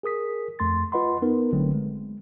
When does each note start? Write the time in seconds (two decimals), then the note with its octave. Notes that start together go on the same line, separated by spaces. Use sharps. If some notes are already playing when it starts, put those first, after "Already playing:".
0.03 G#4 A#4 D#6 B6
0.59 F2 A3 C6 A6
0.92 F4 B4 D#5 F#5 B5 C6
1.22 B3 D#4 A#4 B4
1.53 G#1 D3 F#3 A3 C4
1.73 G#3